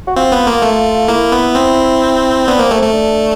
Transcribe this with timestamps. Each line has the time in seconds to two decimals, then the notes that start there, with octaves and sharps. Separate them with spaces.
0.07 F#4
0.16 C4 F4
0.32 B3
0.47 A#3
0.62 A3
1.08 A#3 E4
1.32 B3
1.55 C4
2.47 B3 D4
2.59 A#3 C4
2.71 A3 C4
2.83 A3
2.93 D4